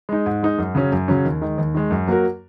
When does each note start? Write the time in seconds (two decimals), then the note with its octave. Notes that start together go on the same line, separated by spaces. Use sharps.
0.09 G#3 D#4
0.26 G#2
0.43 G#3 D#4
0.58 F#2
0.75 C#3 F#3 C#4
0.92 F#2
1.08 C#3 F#3 C#4
1.25 D#2
1.42 D#3 G#3
1.58 D#2
1.75 D#3 G#3
1.91 F#2
2.07 F#3 A#3 F#4 A#4